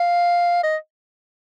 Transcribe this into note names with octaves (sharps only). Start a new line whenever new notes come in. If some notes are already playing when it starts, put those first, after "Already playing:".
Already playing: F5
D#5